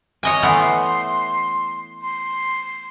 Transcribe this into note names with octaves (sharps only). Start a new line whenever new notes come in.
C#5 D#5 G#5
E3 A3 B3 C6
C6